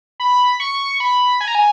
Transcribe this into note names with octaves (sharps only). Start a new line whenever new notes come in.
B5
C#6
C#6
B5
G#5
A#5
G#5